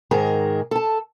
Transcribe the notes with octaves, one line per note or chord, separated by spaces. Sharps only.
G#2 D#3 G#4 A#4 A#5
A4 A5